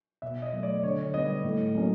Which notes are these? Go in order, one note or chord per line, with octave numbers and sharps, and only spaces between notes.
B2 E5
D#5
F#3 A3
D5
D3 C#5
G3 B3 D#5
A2
F#3 A#3 C#4